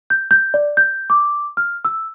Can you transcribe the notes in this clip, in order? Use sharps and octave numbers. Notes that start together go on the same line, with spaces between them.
G6
G6
D5
G6
D6
F6
E6